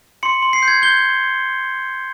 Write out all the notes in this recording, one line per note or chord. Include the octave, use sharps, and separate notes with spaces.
C6 C#7
C6
C7
G6
G#6
G6 G7